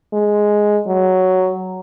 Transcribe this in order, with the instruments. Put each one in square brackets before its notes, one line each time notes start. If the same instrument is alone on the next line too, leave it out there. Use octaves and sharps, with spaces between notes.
[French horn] G#3
F#3